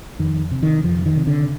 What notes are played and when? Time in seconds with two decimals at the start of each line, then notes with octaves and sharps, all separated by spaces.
0.19 F2 D#3
0.51 C3
0.63 D#3
0.84 F2 F3
1.06 D#3
1.16 C3
1.27 D3